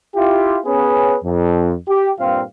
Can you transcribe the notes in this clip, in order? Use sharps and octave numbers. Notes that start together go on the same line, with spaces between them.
E4 F4 G4
B3 C#4 G#4 B4
F2
G4
G2 A#2 C4 F4 F5